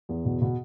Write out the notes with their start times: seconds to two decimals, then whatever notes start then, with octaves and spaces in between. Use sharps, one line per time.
0.09 E2
0.25 B2
0.42 B2